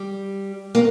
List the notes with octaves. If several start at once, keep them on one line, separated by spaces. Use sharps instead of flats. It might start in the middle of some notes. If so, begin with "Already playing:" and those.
Already playing: G3
A#3